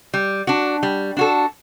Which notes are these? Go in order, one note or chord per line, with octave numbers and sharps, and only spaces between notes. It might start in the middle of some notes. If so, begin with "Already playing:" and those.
G3
D4 F#4
G3
D4 F#4 A4